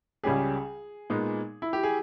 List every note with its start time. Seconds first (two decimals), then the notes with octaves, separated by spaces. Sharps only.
0.24 C#2 C#3 G3 C#4 G4 G#4
1.10 A#2 G#3 B3 D#4
1.62 E4
1.73 G4
1.83 G#4